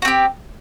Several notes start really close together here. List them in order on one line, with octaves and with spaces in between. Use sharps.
F#4 C4 G4